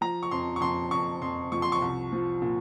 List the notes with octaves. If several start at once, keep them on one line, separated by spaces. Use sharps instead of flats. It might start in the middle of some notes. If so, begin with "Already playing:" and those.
F3 A#5
C#6
F2 C6
C#6
F2 C6
F2 C#6
F2 C6
F3 C#6
C6
C#6
C2
F3
A#2